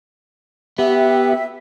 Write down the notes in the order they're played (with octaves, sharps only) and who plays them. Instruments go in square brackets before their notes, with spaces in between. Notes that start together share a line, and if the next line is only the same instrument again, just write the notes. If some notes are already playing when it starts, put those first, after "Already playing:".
[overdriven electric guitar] B3 [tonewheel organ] G4 [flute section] E5